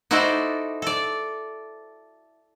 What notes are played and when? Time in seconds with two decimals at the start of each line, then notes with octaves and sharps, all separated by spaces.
0.11 D#4 E4 F#4 A4 C5 D5
0.82 A4 D5